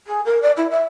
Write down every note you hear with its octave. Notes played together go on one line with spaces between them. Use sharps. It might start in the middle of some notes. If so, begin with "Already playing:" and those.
G#4
A#4
D5
E4
E5